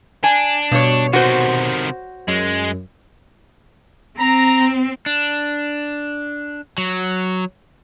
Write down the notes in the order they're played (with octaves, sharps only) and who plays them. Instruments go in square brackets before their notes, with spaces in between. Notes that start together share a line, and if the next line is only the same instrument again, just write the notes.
[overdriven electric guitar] D4 [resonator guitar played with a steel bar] G#5
[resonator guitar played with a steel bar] G2 C#5 [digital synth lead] B2
[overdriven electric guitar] C3 D#3 [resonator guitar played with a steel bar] F#4 C5
[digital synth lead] F#2 [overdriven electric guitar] G#3
[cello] C4 [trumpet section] A#5
[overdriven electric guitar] D4
F#3